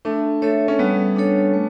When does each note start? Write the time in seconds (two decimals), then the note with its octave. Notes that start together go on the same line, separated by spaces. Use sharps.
0.05 A3 D4
0.42 A3 A4 C#5 E5
0.68 C#4
0.79 G3 B3
1.16 D4 A4 C#5
1.54 A3